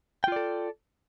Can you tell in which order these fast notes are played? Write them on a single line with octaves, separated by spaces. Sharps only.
G5 F4 D5 A4